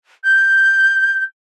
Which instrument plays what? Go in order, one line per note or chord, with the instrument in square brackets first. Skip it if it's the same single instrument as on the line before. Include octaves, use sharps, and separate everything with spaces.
[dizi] G6